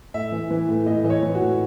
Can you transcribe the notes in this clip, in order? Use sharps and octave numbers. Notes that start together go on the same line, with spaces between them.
A2 E5
E3
E3
A2
A2 D#5
E3 D#5
C#5
E3
F#4
A2